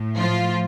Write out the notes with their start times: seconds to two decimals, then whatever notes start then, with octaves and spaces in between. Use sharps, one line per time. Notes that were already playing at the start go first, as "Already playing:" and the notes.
Already playing: A2
0.17 F3 F4